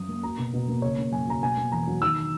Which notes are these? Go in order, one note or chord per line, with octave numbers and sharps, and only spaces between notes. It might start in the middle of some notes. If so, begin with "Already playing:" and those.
Already playing: F#2 D#6
A#3
F#3 A#5
B2
B2
A#3
C#3 C#5
A#3
F#2 G#5
F#3 A#5
B2 G#5
A#3
E2 A#5
F#3
D#3 E6